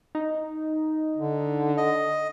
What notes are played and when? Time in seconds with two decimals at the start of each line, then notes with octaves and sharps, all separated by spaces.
0.15 D#4
1.17 D3
1.77 D#5